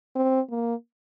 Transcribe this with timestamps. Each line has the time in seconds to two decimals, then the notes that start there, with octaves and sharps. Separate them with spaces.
0.16 C4
0.50 A#3